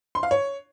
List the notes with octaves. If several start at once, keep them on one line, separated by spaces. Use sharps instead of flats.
C6
F5
C#5